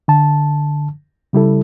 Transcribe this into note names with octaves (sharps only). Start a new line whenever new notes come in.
D3 A5
C#3 G3 E4 A4